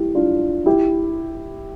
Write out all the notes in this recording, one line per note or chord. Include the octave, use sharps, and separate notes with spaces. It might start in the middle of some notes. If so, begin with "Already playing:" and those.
Already playing: E4 G4
D4 F4
E4 G4